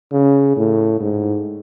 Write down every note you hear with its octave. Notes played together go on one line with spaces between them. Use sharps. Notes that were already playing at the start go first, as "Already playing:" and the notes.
C#3
A2
G#2